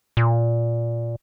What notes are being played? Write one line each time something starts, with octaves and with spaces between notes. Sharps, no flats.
A#2